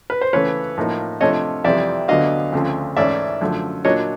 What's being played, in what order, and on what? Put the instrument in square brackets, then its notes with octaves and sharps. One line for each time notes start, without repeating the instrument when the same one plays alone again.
[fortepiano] B4
C5
C#3 E3 A3 B4 C#5
A2 F3 A#3 D#4
C3 F3 A3 D4 C#5 D#5
F2 C3 E3 G3 D5 E5
D2 D3 F#3 B3 D#5 F5
D2 C#3 F3 A3 C4
G#2 E3 A3 C#4 E4 D5 E5
F#2 D3 F3 A3
A#2 F#3 A#3 D4 C#5 D#5